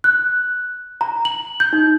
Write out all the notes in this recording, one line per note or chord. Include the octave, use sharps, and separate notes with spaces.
F#6
A#5
F#7
G6
D#4